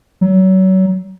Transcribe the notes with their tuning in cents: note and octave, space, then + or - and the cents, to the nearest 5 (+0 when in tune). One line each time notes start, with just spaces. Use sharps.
F#3 +30